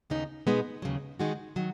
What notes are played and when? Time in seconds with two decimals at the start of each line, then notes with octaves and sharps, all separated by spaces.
0.10 D#2 C#3 B3 D#4
0.47 B2 G#3 B3 D#4
0.82 D#2 C#3 F#3
1.19 D#3 G#3 D#4 F#4
1.56 D#3 F#3